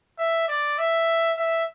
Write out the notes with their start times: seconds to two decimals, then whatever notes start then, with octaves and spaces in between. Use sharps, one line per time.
0.18 E5
0.48 D5
0.78 E5
1.37 E5